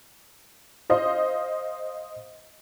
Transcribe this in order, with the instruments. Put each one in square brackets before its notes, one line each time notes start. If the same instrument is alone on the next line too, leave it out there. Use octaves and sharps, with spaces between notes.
[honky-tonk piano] C5 D#5 F5